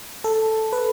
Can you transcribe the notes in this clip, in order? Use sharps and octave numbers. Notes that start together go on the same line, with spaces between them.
A4
B4